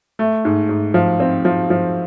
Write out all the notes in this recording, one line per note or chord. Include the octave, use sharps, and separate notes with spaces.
A3
G#2
G#2
F3
C4
F3
F3